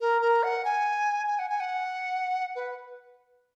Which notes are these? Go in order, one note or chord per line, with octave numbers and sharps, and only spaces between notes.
A#4
A#4
F#5
G#5
G#5
F#5
G#5
F#5
B4